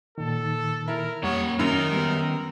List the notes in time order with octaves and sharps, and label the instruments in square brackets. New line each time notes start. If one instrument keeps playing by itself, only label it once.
[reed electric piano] A#2 D#3 [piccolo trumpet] A4
[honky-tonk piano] E4 [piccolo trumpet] A#4
[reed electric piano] F2 G3 [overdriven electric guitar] A#3 F#5 [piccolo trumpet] C#5
[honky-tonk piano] F#2 [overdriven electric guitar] D#3 A#5 [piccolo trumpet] A#4
[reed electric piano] G3 B3